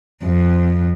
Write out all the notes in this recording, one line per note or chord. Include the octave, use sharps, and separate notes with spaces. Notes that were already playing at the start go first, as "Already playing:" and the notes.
F2